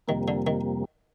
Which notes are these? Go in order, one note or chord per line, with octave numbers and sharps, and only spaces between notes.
F2 C3 D#3 G3 A#3
D3
D#3